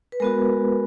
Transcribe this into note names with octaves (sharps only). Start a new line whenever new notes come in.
B4
G#3 B3 F#4 A#4